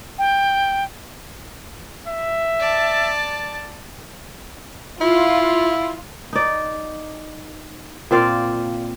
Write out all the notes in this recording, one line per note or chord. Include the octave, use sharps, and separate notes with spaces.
G5
E5
D5 A5
E4 F4
D#4 D5
A#2 C4 D5 F5